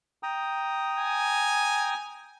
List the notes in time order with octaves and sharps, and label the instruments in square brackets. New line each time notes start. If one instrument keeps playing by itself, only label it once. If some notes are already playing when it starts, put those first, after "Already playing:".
[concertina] G5 A#5 D#6
[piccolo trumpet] G#5